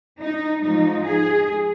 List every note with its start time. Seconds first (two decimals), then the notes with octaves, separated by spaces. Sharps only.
0.19 D#4
0.63 G#2 F3 G#3 D#4
1.05 G#4